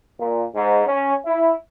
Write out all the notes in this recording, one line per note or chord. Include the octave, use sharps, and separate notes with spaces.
A#2
G#2
C#4
E4